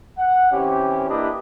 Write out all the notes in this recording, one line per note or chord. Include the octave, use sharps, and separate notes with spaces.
F#5
E3 C4 C#4 G4
A#3 D4 E4 G4 B4 D#5